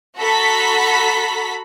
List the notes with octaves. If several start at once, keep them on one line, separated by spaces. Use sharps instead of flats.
F#4 A4 A#5 B5 B6